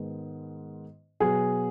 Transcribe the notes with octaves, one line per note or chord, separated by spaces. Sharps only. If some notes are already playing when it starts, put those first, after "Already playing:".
Already playing: G#2 D#3 G#3 B3
B2 F#3 B3 G#4